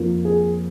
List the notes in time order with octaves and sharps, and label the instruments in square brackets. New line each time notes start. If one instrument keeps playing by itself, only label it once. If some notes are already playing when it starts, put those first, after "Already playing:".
Already playing: [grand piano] F2 F3 A#3
G#4